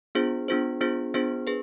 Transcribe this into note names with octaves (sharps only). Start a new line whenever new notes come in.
B3 D4 F4 G#4 C5
B3 D4 F4 G#4 C5
B3 D4 F4 G#4 C5
B3 D4 F4 G#4 C5
G#4 B4